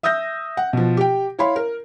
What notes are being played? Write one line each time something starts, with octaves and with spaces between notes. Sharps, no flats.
E5 D#6 E6 G6 A#6
F#5
B2 F3
G4 G5
E4 C#5 F5 B5 C6
A#4